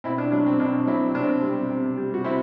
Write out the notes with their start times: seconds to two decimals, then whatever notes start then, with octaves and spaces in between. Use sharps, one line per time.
0.04 B2 C4 E4
0.18 D4
0.32 F#3 D4
0.46 C4
0.60 B2 D4
0.87 F#3 C4 E4
1.15 C3 D4
1.23 C4
1.42 G3 C4
1.69 C3
1.98 G3
2.14 F#4
2.24 C3 C4 E4